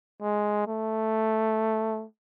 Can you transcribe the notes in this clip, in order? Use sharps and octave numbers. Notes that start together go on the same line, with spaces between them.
G#3
A3